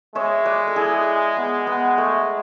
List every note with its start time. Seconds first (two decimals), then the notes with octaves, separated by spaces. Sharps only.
0.15 G#3 C#5 E5
0.45 B4 D5
0.67 A4
0.76 E4 G#4
1.37 B3
1.67 B3
1.98 A3